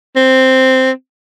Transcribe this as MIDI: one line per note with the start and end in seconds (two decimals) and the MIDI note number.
0.16 0.91 60